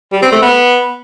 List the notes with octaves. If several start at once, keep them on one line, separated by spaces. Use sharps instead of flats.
G3
C4
A3
B3